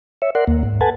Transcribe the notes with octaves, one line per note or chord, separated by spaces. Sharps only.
C#5 E5
A#4 D5 F#5 C6
D#2 A#3
G#2
A4 B4 F#5 G#5 A5